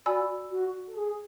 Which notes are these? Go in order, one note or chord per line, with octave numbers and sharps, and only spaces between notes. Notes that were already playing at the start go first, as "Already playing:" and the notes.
F#4 D5 G#5 B5 E6
F#4
A4
G#4